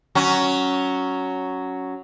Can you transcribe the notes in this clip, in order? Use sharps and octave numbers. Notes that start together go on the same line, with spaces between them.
F#3 C#4